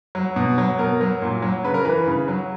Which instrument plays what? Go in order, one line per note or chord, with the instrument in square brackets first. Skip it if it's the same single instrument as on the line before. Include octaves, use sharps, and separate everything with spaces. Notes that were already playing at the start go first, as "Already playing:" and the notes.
[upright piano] F#3
B2
F#3
B2 A#4
F#3
A#2
F#3
C#3 B4
A#4
E3 B4
C#3
F#3